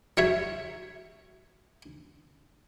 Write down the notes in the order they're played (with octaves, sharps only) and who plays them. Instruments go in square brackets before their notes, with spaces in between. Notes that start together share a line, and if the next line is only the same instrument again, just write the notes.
[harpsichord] F#3 C#5 E5